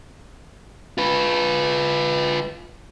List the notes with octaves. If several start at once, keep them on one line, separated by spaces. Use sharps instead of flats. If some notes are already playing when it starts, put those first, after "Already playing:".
F4 B4